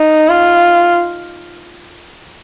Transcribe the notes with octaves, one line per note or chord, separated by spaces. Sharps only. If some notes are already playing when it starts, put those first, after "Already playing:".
Already playing: D#4
F4